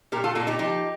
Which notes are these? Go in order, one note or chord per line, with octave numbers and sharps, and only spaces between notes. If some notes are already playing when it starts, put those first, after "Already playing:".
A#2 G4 A#4
F4 A4
A#2 F4 A4
D#4 G4
F3 D#4 G4